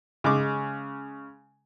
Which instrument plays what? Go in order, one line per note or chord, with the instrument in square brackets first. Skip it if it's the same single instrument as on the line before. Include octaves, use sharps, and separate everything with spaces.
[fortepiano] C#3 G#3 D6